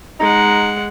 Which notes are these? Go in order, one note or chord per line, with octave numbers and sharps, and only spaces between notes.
G#3 D#4 F#5